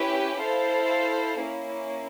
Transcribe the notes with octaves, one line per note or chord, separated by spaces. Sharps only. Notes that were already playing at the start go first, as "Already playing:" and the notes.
Already playing: C#4 E4 G4 B4
E4 A4 C5 F5
A#3 C#4 E4